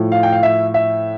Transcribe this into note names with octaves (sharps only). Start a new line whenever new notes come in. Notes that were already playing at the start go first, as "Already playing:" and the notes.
Already playing: A2 F3
F5
G5
F5
E5
E5